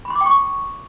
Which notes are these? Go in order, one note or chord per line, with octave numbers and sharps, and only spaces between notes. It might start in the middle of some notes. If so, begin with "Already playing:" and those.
B5
C6
D6
G5
C#6